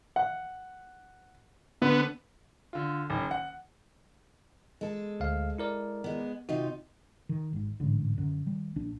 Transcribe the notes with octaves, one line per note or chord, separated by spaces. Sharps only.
F#5
D3 B3
D3 F4
F#1 D#3
F#5
G#3 A4
D2 F5
E4 A#4 D5
G#3 B3
C3 D#4 F4 F#4
D#3
G#1 G#2
A1 G#2 D3
F#2 D3
D#3 G3
A#1 D4